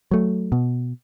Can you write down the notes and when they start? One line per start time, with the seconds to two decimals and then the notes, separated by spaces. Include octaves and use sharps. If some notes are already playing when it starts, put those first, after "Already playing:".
0.11 F#3 A3
0.52 B2